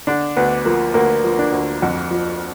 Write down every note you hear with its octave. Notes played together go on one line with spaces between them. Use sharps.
D3 D4
D2 B3
F3 A#3
D2 A#3
F3
D4
D2
F2
F3